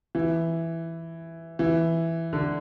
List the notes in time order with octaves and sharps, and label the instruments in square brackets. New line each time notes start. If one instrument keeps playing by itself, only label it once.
[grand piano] E3
E3
D3